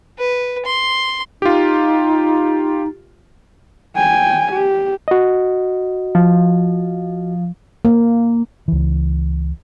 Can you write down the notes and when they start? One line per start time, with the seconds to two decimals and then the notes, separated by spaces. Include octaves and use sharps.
0.19 B4
0.65 C6
1.42 D#4 F4 G4
3.96 G5 G#5
4.52 G4
5.08 F#4 D#5
6.15 F3
7.85 A#3
8.68 C#2 E3